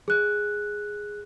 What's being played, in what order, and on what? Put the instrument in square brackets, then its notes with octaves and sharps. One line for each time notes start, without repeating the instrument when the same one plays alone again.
[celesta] G#4 F#6